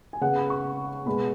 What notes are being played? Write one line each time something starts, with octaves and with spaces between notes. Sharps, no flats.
G#5
C#3 B3 F#5
B5
C#6
B2 G#3 B3 B5